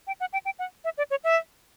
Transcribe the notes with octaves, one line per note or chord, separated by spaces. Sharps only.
G5
F#5
G5
G5
F#5
E5
D5
C#5
E5